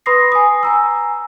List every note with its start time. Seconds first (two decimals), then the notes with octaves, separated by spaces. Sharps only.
0.06 B4 B5 C6 D#6 A#6 C7
0.32 G#5 D#6
0.63 G#5 A#5 E6